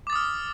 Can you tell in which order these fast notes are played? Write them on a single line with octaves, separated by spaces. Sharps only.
D6 A6 D#6 F6